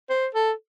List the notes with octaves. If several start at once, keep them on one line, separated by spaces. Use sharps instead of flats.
C5
A4